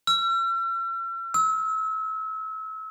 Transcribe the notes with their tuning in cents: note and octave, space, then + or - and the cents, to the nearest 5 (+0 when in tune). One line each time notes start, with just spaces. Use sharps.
E6 +45
E6 -30